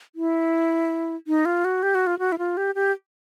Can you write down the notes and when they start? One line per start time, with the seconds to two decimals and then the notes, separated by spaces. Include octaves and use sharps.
0.15 E4
1.27 D#4
1.45 F4
1.65 F#4
1.83 G4
1.95 F#4
2.07 F4
2.19 F#4
2.32 E4
2.38 F4
2.57 G4
2.75 G4